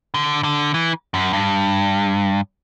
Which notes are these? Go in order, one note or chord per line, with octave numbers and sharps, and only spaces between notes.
D3
D3
E3
F#2
G2